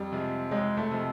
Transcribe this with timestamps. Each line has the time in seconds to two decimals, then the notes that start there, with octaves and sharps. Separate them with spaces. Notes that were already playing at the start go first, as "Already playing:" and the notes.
Already playing: F2 G3
0.12 C3 F3 G#3
0.51 F2 G#3
0.77 A3
0.91 C3 F3 G#3